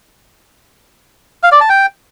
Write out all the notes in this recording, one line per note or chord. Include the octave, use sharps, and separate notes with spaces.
F5
D5
A5
G5